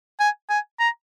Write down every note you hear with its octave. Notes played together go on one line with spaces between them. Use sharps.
G#5
G#5
A#5